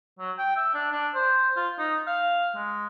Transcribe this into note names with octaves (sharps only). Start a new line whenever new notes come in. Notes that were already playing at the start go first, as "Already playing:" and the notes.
F#3
G5
E5
D4
D4
C5
F4
D#4
F5
G#3